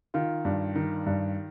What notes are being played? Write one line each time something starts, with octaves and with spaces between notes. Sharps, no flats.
D#3 F4
G2
D#3
G2